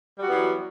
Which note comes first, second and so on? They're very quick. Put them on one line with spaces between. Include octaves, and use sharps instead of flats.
G3 F#4 B3 E3 F#3